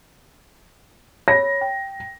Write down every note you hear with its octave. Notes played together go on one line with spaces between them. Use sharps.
C#5 B5 A#6
G5